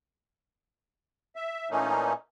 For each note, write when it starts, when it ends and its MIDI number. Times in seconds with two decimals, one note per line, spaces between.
1.36 1.69 76
1.71 2.13 46
1.71 2.13 52
1.71 2.13 57
1.71 2.13 58
1.71 2.13 61
1.71 2.13 63